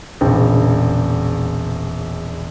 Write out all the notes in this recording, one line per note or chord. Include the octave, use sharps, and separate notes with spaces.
E1 A#1 C#3 G5